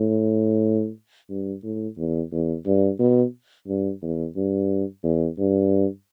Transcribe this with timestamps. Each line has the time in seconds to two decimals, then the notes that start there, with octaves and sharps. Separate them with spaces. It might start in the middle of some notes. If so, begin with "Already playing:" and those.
Already playing: A2
1.30 G2
1.64 A2
1.98 E2
2.32 E2
2.66 G2
2.99 B2
3.67 G2
4.02 E2
4.36 G2
5.04 E2
5.38 G2